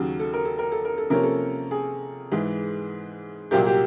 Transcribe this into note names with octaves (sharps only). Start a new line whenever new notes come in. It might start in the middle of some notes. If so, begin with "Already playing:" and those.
Already playing: D#2 C#3 F#3
A4
A#4
A4
A#4
A4
A#4
A4
C3 F3 A#3 C#4 A#4
A4
G#4
G#2 E3 G#3
C2 A#2 F#3 A#3 G4
G4